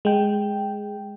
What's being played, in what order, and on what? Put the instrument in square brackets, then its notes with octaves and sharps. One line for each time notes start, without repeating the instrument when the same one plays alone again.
[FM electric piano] G#3 G5